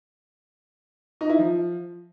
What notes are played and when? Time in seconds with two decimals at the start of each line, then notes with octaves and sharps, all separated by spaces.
1.21 D#4
1.30 E4
1.38 F3